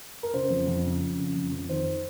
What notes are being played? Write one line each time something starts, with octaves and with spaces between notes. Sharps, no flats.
A#4
C#3 C5
F2
F2
C#3
F2
C#3
F2
F2
D#3 C5